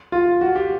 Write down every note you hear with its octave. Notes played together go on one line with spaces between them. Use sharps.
F4
F#4
G4